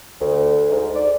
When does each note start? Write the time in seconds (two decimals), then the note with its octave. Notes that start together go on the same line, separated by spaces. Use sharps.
0.20 D2
0.70 G#2
0.94 D5